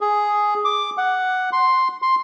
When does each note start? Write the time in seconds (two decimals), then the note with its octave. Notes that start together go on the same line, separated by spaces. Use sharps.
0.01 G#4
0.65 D6
0.98 F#5
1.52 C6
2.02 C6